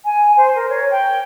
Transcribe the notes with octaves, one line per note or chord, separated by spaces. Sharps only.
G#5
C5
A#4
C#5
G5